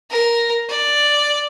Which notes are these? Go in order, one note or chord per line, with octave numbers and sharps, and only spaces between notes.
A#4
D5